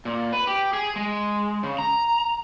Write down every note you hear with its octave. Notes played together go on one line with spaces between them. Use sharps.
A#2
B4
G4
G#4
G#3
C#3
A#5